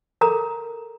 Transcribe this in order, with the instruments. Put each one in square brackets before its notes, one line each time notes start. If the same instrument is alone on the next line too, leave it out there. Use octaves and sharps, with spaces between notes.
[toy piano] A4 A#4 A#5